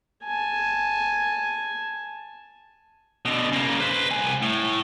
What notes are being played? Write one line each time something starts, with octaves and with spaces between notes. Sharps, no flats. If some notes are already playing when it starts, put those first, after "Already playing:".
G#5 A5
B2 D3
C#3 A#3
B4 C5
C2 G#5
A2